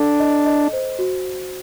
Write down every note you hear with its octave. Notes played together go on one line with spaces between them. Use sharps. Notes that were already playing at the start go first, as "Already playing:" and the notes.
Already playing: D4 A4
D#5
D#5
C5
F#4